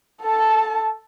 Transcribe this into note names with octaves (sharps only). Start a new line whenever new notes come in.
A4 A5